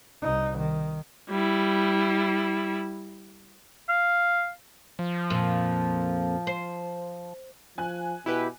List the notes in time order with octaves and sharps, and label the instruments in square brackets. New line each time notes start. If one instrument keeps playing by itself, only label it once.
[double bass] C2 D#4
D#3
[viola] G3 E4
[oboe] F5
[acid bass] F3
[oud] F2 A#2
C5
[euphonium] F3 [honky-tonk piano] G#5 F#6
[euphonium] B2 [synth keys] E4 G4 B4